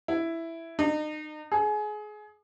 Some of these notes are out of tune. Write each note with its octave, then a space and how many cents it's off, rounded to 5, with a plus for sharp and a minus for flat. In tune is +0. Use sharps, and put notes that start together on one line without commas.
E4 +5
D#4 -35
G#4 +25